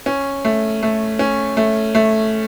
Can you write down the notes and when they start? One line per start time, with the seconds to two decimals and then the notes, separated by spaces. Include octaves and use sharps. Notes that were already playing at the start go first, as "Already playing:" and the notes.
0.06 C#4
0.45 A3
0.83 A3
1.19 C#4
1.57 A3
1.95 A3